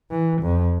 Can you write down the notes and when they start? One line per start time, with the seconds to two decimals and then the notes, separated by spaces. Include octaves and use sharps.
0.11 E3
0.42 F2